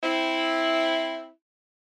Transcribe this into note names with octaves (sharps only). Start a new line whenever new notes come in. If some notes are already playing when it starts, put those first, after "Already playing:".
C4 E4